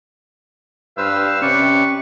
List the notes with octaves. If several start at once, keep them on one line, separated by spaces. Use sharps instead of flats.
G2 B4 C5 F5 E6
C3 C#4 B4 D5 C#6